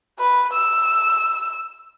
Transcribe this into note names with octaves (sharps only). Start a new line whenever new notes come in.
B4
E6